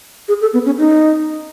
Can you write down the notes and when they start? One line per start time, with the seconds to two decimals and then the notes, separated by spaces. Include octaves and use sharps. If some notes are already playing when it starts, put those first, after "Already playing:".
0.28 G#4
0.41 A4
0.53 B3
0.66 C#4
0.78 D#4